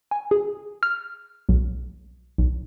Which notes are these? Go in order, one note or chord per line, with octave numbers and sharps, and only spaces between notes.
G#5
G#4
F6
B1
B1